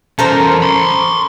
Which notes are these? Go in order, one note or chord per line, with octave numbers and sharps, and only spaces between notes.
E2 C#4 A4 A#4 C5
B5 C6